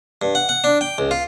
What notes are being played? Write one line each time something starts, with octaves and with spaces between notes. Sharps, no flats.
G2
F#5
F#5
D4
G5
C#2
F4